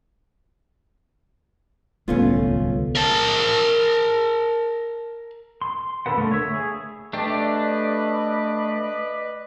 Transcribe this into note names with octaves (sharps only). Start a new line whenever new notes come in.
D1 C2 D3 G3 A3 B3 C#4 F4
A#4 A5
C6
D3 A4 B4 F#5
D3 A3 A#3
C#5 E5
G#4
A3 D4 G4 B4 D5 D#5